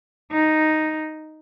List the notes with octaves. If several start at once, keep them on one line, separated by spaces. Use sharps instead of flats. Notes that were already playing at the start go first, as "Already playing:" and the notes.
D#4